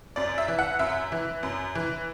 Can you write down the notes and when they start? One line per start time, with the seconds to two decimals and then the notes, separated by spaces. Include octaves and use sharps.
0.16 F#2 D5
0.38 E5
0.48 E3
0.59 F#5
0.79 F#2 E5
1.12 E3
1.43 F#2
1.75 E3